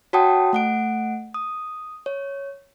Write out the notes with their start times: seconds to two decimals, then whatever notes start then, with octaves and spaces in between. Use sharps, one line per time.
0.13 F#4 C#5 F#5 G5 A5 D#6
0.53 A3 F#5 D7
1.34 D#6
2.06 C#5